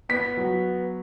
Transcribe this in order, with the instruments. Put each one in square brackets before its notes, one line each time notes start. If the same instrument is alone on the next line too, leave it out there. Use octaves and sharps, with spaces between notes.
[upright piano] B3 [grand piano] B6
[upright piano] F#3